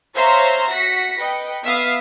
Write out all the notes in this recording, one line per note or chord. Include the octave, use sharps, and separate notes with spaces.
C5 C#5 E5 F5 A#5 C6
F#4 A#6 B6 C#7
B4 D#5 G5 C#7
B3 E5 F5 D#6